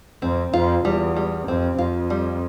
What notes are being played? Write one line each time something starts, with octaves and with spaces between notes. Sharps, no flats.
F2 C4
F2 F4
E2 G3
G3
F2 C4
F2 F4
G3